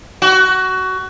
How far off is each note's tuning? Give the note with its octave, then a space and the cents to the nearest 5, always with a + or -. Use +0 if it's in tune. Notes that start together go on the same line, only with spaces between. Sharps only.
F#4 +20